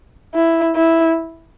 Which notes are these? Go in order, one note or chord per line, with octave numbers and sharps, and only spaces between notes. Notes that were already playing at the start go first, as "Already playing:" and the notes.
E4
E4